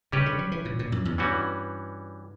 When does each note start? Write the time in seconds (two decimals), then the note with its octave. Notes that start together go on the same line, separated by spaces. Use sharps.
0.12 C#3 G3 C#4 G4 B4
0.26 D3
0.39 F#3
0.52 E3
0.65 A#2
0.79 A#2
0.92 F#2
1.05 E2
1.18 G2 E3 G3 C#4 F#4